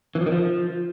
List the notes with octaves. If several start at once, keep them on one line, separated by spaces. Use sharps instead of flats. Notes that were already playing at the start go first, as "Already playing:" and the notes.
E3
F3
D#3
F3